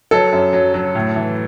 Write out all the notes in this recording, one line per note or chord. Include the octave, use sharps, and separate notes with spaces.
F#3 A4
F#2
F#3
F#3
A2
E3